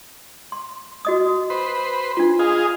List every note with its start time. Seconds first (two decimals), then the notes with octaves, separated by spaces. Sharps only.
0.52 C6
1.05 F#4 D#5 D#6
1.50 B4 C5
2.17 D4 F4
2.39 G#4 D#5 F5